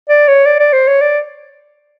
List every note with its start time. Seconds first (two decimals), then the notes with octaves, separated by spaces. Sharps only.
0.09 D5
0.28 C#5
0.46 D5
0.59 D5
0.73 C5
0.87 C#5
1.01 D5